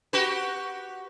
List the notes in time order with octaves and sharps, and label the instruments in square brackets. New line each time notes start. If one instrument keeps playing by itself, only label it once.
[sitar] F#4 G4 B4